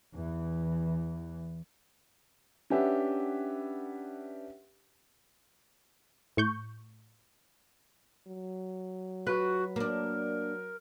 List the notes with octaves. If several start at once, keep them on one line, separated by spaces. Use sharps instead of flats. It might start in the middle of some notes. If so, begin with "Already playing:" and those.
E2 E3
C#4 D4 G4 B4 E5 F#5
A2 C#6 G6
F#3
F4 F#4 B4
A#3 D4 A#4